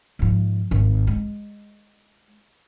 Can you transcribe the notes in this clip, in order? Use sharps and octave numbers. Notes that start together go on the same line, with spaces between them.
G#2 F3
G#1
G#3